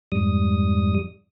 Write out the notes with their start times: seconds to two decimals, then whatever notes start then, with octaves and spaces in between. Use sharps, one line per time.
0.12 F2 G#2 G3 D#6